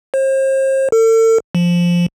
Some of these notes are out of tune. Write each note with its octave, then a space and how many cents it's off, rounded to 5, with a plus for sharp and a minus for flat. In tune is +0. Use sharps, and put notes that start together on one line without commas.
C5 +40
A4 +40
F3 +0